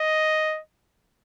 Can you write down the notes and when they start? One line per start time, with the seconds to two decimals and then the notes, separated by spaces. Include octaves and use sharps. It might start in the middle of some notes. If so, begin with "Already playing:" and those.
Already playing: D#5